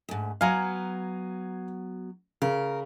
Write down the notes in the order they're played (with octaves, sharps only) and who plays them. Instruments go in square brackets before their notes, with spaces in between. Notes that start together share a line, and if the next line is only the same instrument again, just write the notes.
[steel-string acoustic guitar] D2 G#2
[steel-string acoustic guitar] F#3 B3 [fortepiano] F5 G#5 A#5
[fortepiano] C#3 [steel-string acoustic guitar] A#4